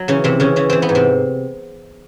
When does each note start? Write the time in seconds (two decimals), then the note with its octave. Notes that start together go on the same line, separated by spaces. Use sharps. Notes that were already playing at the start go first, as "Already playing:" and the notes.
Already playing: F#3
0.08 C#3 E3 C#4
0.24 C3 E3 C4
0.40 C#3 E3 C#4
0.56 E3 C#4
0.70 E3 C4
0.82 B3
0.89 G#2
0.95 C3 C4